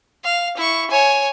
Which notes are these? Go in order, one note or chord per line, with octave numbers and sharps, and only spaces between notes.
F5
E4 C#6
C#5 G#5